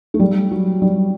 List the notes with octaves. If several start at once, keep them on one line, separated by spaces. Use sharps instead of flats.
A3
G3
F#3
G3